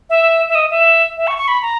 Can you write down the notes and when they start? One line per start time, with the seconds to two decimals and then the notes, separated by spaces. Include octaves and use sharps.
0.10 E5
0.49 E5
0.55 D#5
0.70 E5
1.17 E5
1.27 C#6
1.38 C#6
1.48 B5
1.62 A#5